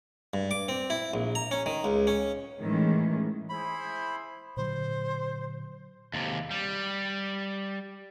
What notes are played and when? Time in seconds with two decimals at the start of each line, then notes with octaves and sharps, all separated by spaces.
0.34 G2
0.51 D6
0.68 C4
0.90 E4
1.14 A#1
1.35 A#5
1.51 C#4
1.66 D#3
1.84 C#2
2.07 C#4
2.61 A2 D#3 E3 G#3 C#4
3.49 E4 G#4 C5 B5
4.57 A#2 D3 F#3 C5
6.14 D#2 C3
6.51 G3